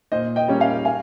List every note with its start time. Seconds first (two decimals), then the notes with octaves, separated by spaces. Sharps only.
0.12 A#2 C5 D#5
0.36 D#5 G5
0.48 G3 A#3 C#4
0.60 F5 G#5
0.85 F5 G#5